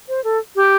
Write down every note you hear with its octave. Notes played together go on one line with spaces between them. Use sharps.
C5
A4
G4